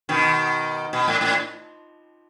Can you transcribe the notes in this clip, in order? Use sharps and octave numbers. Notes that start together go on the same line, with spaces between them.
B2 D#3
B2
A2
A2